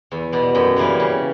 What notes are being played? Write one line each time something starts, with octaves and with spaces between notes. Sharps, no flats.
E2
B2 G3
F#2
C#3 E3 G3 A#3
C#3